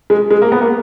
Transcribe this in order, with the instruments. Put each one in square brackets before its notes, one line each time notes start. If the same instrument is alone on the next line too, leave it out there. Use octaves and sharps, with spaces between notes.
[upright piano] G#3
G#3
A#3
B3
A#3